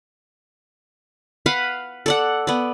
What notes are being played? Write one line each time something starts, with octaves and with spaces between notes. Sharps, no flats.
B4 F5 F#5 B5
A4 D5 F#5
B3 D5